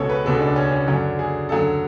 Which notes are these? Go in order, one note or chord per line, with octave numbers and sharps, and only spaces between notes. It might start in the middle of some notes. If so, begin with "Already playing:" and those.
Already playing: C#2 B2 G#3 A4 C#5
B4
C#2 B2 G#3 A4
D4
C#4
C#4
F#2 D3 F#3 D4
G#4
F#2 D3 F#3 A4